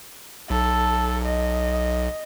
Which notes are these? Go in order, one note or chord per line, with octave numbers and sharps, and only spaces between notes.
B1 A4
D#5